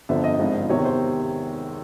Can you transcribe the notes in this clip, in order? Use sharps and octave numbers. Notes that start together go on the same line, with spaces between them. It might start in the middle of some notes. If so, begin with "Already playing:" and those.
G1 F2 D3 F3 E5
D#5
G#1 G#2 F3
E2 C3 D#3 C#5
C5